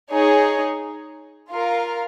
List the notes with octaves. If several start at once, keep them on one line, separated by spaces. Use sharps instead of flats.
D#4 G#4 C#5
F4 A#4 F5